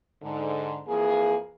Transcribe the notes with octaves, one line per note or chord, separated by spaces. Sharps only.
G#2 D3
F2 E3 A#3 G#4